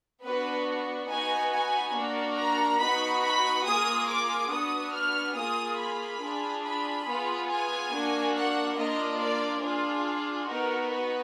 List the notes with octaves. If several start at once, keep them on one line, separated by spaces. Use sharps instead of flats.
B3 D4 F#4 B4
B3 D#4 F#4 G#5
G#5
A#3 D4 F#4
A#5
B3 D#4 F#4 B5
B5
A#3 F4 G#4 D#6
D6
B3 D4 F#4 D#6
F6
A#3 F4 G#4 D#6
B5
D4 F4 G#4
B5
B3 F4 G#4
G#5
A#3 D4 F#4
F#5
A#3 D4 F4 D#5
D5
D4 F4 G#4
B3 D#4 F#4 A#4
B4